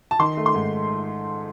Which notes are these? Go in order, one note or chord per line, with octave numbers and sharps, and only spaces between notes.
A5
D#3 C6
A3
C6
G#2